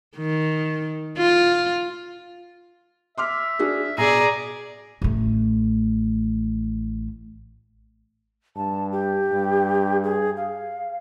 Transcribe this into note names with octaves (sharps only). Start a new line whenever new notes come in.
D#3
F4
E5 C6 D6 F6
D4 F#4 G#4
B2 G#4 D5 A#5
A1 A3
G2 A5
G4
G2
G#4
F5